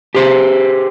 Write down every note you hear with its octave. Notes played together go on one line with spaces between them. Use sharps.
G4 G#4 C5